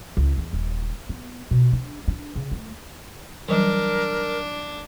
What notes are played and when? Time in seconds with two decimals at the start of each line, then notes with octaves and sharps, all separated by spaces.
0.17 C#2
0.38 E2
0.53 D#1
1.09 B3
1.51 B2
1.73 D4
2.08 D4
2.35 C#3
2.51 A3
3.48 E3 F#3 G3 D4 A#4